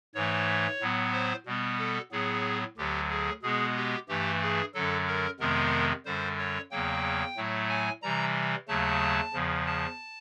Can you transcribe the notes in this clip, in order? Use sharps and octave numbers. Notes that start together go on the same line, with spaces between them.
G#2 E3 A3 C#5
A2 F#3 B3
C5
B2 G3 B3
A4
A2 F#3 B3 G#4
D2 D3 F#3 G4
G#4
B2 G#3 B3 G#4
G4
G2 E3 A3 G4
G#4
F#2 D3 F#3 A4
A#4
F2 C3 D#3 G#3 B3 A#4
F#2 D3 G3 C5
C#5
E2 C#3 F#3 A#3 G5
A2 F#3 A3
G#5
C3 E3 G3 A#5
D#2 C#3 F#3 A3 A5
E2 C#3 F3
A5